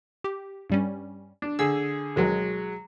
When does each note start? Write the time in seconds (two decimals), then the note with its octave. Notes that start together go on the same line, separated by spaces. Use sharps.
0.24 G4
0.70 G2 G3 C#4
1.42 D4
1.59 D3 G#4 E6
2.16 D2 B2 D#3 F#3 G#3